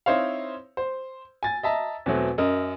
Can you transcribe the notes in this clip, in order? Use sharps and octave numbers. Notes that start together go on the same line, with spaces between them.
C4 D#4 E4 C5 C#5 F5
C5
G#5 A6
D#5 E5 A5 A#5
E2 B2 F#3 A3 C4
F#2 A#4 D#5